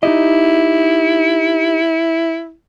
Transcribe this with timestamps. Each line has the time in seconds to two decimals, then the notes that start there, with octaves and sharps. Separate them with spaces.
0.03 D#4 E4 G4 D#5